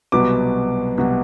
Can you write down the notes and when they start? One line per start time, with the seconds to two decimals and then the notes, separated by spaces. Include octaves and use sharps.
0.12 C2 B2 F#3 B3 D6
0.98 C2 B2 F#3 B3